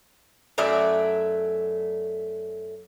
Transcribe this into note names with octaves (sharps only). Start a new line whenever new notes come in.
F#2 F#3 A3 D5